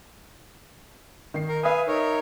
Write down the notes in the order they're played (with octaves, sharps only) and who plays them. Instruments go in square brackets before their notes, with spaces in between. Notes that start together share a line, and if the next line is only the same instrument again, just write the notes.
[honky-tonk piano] D#3 C7
[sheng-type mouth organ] A#4
[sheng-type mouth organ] B4 F5 G#5 [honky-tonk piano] E5 D#6
[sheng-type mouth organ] D#4 A#4 C#5